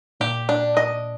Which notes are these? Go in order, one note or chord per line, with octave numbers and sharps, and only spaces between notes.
A#2 G4
D4
D#5